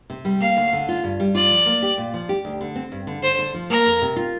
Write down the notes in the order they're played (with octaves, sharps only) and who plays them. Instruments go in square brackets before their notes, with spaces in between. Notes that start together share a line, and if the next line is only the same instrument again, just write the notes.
[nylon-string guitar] C3
G3
[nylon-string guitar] A#3 [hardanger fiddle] F5
[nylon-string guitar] D2
D3
F4
G2
G3
[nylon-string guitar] F4 [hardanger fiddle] D5
[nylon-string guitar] F3
A#3
G4
A#2
F3
G4
D2
D3
C4
G2
D3
[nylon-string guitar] D3 [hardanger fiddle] C5
[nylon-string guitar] D3
F3
[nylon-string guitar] A#3 [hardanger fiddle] A#4
[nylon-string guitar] F2
C3
F4